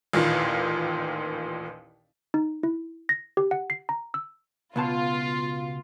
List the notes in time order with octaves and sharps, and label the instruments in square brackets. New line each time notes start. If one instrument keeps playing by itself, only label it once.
[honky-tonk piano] A1 D#2 A#2 D#3
[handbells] D#4
E4
A#6
G4
F#5
C7
A#5
E6
[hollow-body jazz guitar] C#2 B2 A5 [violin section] F4